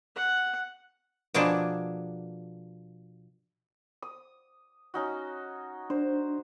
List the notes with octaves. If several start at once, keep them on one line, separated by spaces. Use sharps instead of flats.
F#5
B2 F3 A#3 D4 G#4
D#6
C#4 D#4 F#4
D4 C5